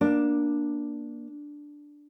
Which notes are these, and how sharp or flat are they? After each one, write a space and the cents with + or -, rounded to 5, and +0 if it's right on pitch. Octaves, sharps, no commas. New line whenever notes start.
A#3 +20 D4 +0